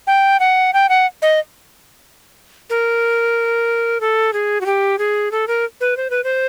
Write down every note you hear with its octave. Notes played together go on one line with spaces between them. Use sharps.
G5
F#5
G5
F#5
D#5
A#4
A4
G#4
F#4
G4
G#4
A4
A#4
B4
C5
B4
C5